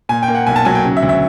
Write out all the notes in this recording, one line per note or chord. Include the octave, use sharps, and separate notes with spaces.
A#2 G#5
G5
A#3
F#5
B1 G#5
A5
F#3 G#5
G5
C#3
E5
D2
E5